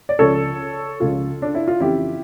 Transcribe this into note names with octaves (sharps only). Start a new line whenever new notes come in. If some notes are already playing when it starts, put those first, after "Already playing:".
D5
C#2 C#3 F3 A4 C#5
C#2 C#3 F3 F4 A4
D4
E4
F4
F2 C#3 E3 E4 G4